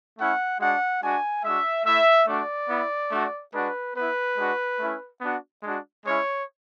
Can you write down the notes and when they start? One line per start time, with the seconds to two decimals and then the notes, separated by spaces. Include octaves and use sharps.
0.18 A3 C#4 E4 F#5
0.60 G#3 D4 F#4 F#5
1.02 G#3 D4 F#4 G#5
1.44 G#3 D4 F#4 E5
1.85 A3 E4 E5
2.27 A3 D4 F#4 D5
2.69 B3 E4
3.12 A3 D4 F#4
3.53 G#3 D4 F#4 B4
3.95 B3 E4 B4
4.37 G#3 D4 F#4
4.79 A3 C#4 E4
5.21 B3 D4 F#4
5.63 G#3 D4 F#4
6.05 G#3 C#4 E4 C#5